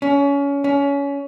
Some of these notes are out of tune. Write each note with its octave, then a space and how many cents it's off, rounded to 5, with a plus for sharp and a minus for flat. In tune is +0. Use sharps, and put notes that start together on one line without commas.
C#4 +25
C#4 +25